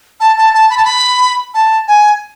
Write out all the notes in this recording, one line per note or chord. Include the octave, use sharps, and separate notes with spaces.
A5
A5
A5
B5
A5
B5
A5
G#5